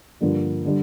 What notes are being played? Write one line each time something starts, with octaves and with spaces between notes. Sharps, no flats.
G2 D3 F3 A#3 D4
D3 G3